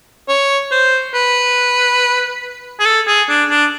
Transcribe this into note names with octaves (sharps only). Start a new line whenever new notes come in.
C#5
C5
B4
G#4
A4
G#4
D4
D4